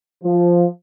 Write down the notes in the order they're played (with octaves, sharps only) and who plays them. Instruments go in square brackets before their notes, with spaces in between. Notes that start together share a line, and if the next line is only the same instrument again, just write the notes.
[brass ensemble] F3